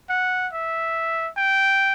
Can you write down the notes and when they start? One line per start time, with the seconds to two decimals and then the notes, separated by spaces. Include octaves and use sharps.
0.10 F#5
0.53 E5
1.37 G5